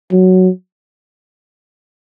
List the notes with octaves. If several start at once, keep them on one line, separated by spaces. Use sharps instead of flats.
F#3